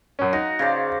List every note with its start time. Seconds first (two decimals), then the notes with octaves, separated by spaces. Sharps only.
0.19 F#2 C#4
0.33 D#4 F#4
0.59 C#3 C5 D5